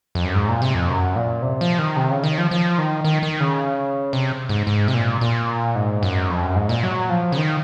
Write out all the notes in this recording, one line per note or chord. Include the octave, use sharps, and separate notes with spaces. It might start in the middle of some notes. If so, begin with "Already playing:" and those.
F2
F#2
G#2
A#2
C3
F2
F#2
A#2
C3
F3
D#3
C3
C#3
D#3
F3
F3
D#3
D#3
D#3
C#3
C3
G#2
G#2
C3
A#2
A#2
G#2
F#2
F2
F#2
G#2
A#2
F#3
F3
C#3
D#3